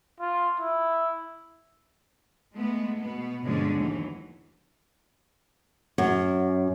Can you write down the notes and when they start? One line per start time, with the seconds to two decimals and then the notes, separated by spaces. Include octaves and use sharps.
0.20 F4
0.60 E4
2.55 G#3 A3 B3
3.01 B2 B3
3.42 G2 B2 D3 F3 G#3 C#4
3.76 D#2 E3 F#3
5.98 F#2